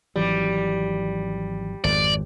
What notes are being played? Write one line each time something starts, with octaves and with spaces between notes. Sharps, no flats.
G#1 E3 F#3 G3
G#1 F2 D5